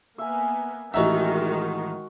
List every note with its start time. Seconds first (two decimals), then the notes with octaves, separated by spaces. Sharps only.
0.18 A#3 B3 E5 G#5
0.94 A1 D#3 G#3 D#4 F#4 E5 F#5